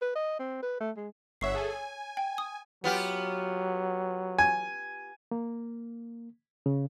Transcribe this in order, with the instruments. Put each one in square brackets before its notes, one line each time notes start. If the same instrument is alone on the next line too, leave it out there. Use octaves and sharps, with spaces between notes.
[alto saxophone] B4
D#5
C4
B4
A3
G#3
[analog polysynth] G1 E5 F#5 [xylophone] C#5 C#6 C7
[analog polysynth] G#4 A4 G#5
G#5
[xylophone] G5
D#6
[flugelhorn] F#3 [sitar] B3 F4 G4
[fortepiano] G#5
[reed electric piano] A#3
C#3